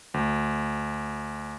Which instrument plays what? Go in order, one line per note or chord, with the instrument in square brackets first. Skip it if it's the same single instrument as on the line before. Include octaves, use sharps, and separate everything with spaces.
[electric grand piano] D2